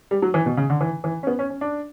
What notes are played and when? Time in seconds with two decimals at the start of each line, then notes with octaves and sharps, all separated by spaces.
0.11 G3
0.22 F#3
0.34 E3
0.46 B2
0.57 C#3
0.70 D3
0.81 E3
1.04 E3
1.23 C#4
1.27 B3
1.39 C#4
1.50 C#4
1.61 D4